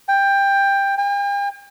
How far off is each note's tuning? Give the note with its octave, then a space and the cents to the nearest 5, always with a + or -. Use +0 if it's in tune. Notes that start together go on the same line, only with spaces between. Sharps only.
G5 +15
G5 +45